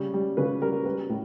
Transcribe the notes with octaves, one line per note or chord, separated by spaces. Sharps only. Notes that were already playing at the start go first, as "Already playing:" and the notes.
Already playing: C#3 G3
G3
C#3 B4
G3 A#4
G3 B4
A2